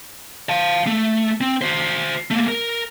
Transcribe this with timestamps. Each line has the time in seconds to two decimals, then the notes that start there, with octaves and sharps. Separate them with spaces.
0.49 F5 A5
0.87 A3
1.41 C4
1.62 F#4 C5
2.31 A3 A#3
2.48 A#4